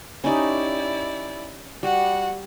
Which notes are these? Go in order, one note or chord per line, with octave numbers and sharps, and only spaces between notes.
C#4 D#4 E4 G4 D5
G3 F#4 F#5